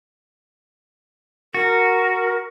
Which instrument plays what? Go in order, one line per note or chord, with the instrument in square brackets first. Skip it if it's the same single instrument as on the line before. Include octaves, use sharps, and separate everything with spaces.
[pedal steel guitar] F#4 [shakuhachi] A#4